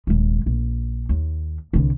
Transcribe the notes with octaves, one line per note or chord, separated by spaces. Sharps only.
D#1 G#3
A#1
D#2
C2 D3